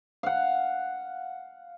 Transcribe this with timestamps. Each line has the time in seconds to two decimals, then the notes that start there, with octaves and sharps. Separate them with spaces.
0.23 F5 F#5